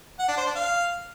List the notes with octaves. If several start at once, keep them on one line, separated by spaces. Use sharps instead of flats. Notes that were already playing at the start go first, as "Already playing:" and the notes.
F#5
D4
C5
D4
F5